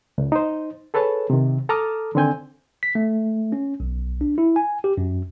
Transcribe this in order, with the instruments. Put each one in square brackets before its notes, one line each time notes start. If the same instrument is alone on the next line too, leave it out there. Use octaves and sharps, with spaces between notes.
[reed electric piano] C#2
D#4 C5
G#4 A4 B4 C#5 A5
C3 D#3
A4 A5 A#5 D6 D#6 F6
D3 D#3 C4 G#5 G6
[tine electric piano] B6
A3
C#4
B1
D4
E4
G#5
G4
F#2